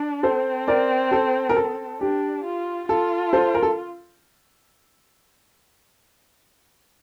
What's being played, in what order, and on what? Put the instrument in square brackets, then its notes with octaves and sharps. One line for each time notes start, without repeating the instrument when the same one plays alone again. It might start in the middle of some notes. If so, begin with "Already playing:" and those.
Already playing: [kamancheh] D4
[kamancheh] C4 [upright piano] A4 C5
[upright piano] A#4 D5
A4 C5
A#4
A4
[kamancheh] D4 [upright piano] G4
[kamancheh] F4
[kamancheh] F4 [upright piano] A4
[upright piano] A4 C5
A#4
A4